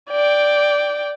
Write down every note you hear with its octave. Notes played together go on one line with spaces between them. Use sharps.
D5 G5